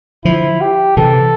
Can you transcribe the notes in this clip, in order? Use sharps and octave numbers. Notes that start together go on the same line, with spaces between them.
D3 F3 E4
G4
C3 E3 A4